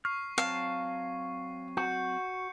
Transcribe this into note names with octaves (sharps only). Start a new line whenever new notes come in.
C#6 F6 C7
F#3 C4 F5 A5
F#4 G6 C#7